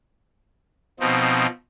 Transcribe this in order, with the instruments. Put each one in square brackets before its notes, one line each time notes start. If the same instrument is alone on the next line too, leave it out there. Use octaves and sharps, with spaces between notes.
[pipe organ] B2 F3 C4 D#4